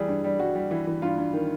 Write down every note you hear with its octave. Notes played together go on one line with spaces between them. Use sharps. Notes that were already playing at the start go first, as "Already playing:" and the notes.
Already playing: E3 G3 G#4
G2
G3
G3 F#4
G3
E3
E3
G2 F4
G2
D#3